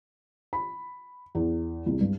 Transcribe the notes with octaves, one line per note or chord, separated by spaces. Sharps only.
B5
E2
C2
G2